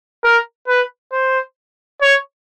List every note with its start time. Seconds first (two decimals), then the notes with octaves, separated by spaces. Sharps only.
0.24 A#4
0.68 B4
1.12 C5
2.01 C#5